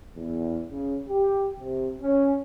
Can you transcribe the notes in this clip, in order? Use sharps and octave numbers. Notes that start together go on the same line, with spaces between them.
E2
C#3
G4
C3
C#4